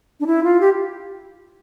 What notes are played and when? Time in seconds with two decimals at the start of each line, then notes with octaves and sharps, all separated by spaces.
0.20 D4
0.27 E4
0.44 F4
0.61 G4